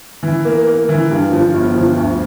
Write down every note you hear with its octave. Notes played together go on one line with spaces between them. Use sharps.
E3
A#3
A#3
E3
G2
F3
G1
F3
D2